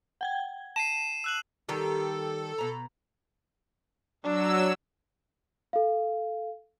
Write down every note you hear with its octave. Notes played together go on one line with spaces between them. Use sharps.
F#5 G5 G#6
A5 C7 D#7 E7
E6 F#6 F#7
D#3 G3 G4 A4
B2 A#5
F#3 D4 E6
A4 F5